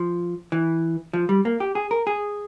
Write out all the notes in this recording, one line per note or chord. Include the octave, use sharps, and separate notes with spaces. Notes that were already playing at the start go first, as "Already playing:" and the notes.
Already playing: F3
E3
F3
G3
A#3
G4
G#4
A#4
G#4